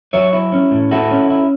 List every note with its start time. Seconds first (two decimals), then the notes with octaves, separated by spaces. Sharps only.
0.13 F#3 C#5 E5
0.33 E4
0.52 C#4
0.71 A2
0.91 E4 F#4 A4
1.11 C#4
1.30 E4